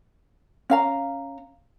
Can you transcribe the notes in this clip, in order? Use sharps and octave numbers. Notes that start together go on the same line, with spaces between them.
C#4 F5 A#5